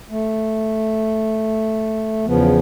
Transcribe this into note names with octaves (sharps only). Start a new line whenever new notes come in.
A3
E2 C#3 F3 B3